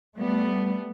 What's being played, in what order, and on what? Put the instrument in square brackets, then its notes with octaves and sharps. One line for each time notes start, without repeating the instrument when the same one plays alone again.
[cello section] G3 A3 B3